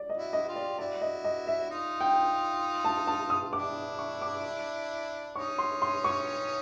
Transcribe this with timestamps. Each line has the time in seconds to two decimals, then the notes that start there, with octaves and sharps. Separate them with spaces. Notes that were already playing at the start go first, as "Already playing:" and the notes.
Already playing: D5
0.10 D#5
0.18 E4 F#4
0.33 D#5
0.42 F#4
0.48 F4 G4
0.56 D5
0.79 E4 F#4 D5
1.02 D#5
1.25 D#5
1.47 E5
1.70 D#4 F4
2.01 G5
2.85 A5
3.07 A5
3.30 D#6
3.53 D4 E4 D6
3.99 C#6
4.22 D6
5.36 C#4 D#4 C#6
5.58 C6
5.82 C6
6.04 C#6